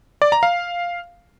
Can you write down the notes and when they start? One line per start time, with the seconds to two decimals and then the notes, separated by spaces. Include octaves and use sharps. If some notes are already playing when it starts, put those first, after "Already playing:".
0.22 D5
0.32 A#5
0.43 F5